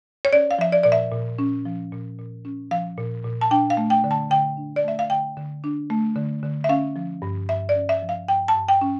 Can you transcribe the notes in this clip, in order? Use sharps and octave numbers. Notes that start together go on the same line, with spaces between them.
C#5
C#4 D5
F5
F3 E5
D5
A#2 D5
E5
A#2
C#4
F3
A#2
A#2
C#4
F3 F5
A#2
A#2
A5
D4 G5
F5
A3
G5
D3
A5
D3 G5
D4
D5
A3 E5
F5
D3 G5
D3
D4
A3
D3
D3
E5
C#4 F5
F3
G2
G2 E5
D5
C#4
E5
F3
F5
G2 G5
A5
G2
G5
C#4